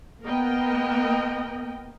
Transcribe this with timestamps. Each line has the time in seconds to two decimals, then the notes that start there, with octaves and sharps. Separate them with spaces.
0.24 A#3 B3 A#4 D#5 G5